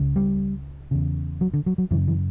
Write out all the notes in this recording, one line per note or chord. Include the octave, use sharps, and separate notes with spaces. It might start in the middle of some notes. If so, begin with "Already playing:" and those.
Already playing: C#2 C#3
G3
E2 C#3
F#3
D3
F#3
F#3
F#2 C#3 E3
E3